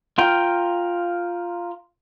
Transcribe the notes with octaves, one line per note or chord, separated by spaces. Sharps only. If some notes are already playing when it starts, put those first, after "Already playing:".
F4 A#4 G5